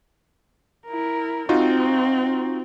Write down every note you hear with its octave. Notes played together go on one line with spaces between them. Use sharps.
E4 A#4
C4 D#4 F4 F#4